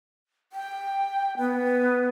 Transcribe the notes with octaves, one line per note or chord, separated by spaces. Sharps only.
G5
B3